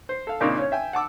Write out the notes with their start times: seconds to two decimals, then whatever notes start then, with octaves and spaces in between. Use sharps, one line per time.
0.09 C5
0.27 A4 F5
0.41 A#2 C#3 A#3 C4 D4 D#4
0.58 C#4 C#5
0.72 E5 G5 G#5
0.93 F#5 A5 D6 E6